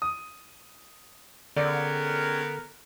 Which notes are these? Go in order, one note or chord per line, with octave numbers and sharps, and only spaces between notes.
D#6
D3 B3 C#4 G#4 A#4 D5 G5